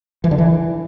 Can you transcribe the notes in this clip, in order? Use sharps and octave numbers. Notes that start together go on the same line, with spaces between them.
E3
D3
E3